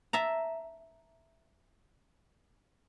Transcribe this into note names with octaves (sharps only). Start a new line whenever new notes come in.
E5 A5 A#5